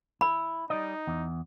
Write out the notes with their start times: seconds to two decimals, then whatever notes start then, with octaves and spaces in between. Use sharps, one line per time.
0.21 E4 B5
0.70 G3 D#4 D5 D#5
1.07 E2